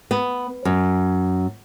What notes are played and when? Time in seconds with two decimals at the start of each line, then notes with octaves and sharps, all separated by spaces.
0.11 B3
0.65 F#2